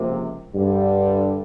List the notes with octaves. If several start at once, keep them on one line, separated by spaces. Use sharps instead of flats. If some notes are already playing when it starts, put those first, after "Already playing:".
Already playing: C#2 C3 F3 A#3
G2 D3 G3